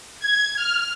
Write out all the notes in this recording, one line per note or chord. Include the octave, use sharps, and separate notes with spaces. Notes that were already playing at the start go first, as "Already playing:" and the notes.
G#6
F6